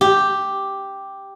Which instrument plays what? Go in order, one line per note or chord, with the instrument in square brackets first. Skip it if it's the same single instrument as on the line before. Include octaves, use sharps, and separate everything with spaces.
[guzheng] G4